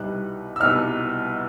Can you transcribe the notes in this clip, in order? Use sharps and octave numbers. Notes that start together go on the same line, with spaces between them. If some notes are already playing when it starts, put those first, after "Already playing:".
Already playing: C2 B2 G3 B3 D#4 F#6
E6
C2 B2 G3 B3 D#4 F6